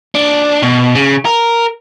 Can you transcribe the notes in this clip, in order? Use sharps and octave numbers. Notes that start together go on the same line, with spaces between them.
D4
B2
C#3
A#4